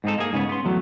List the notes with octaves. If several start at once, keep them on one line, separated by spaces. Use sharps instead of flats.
G#2 C4 D#4 A4
A#3 G#4
G#2 C#3 B3
B3 C6
E2 F#3 A3